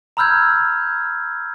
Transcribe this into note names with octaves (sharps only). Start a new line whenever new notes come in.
A#5 B5 E6 F6 G6 G#6